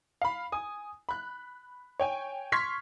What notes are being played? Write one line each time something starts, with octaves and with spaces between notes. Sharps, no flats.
F5 B5
G#5 D#6
B5 F#6
C#5 G5 G#5
C6 C#6 F6 G#6 B6 C7